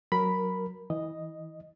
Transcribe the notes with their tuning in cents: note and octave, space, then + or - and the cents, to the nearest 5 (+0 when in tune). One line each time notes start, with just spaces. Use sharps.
F#3 +0 A#4 +0 B5 +0
E3 -25 D#5 +0